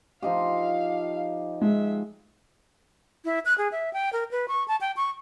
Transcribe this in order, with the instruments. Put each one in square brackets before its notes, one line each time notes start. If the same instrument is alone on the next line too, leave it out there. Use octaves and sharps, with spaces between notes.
[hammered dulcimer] F3 D#4 G4 [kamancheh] F5
[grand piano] G#3 [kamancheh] E5
[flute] E4
F#6
G#4
E5
G5
A#4
B4
C#6
A5
G5
C#6